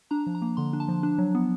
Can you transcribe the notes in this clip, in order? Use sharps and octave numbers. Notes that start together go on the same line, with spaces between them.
D4 A#5
F3
A#5
A#3
D3 C6
D4
A5
F3
D4
F#3
B3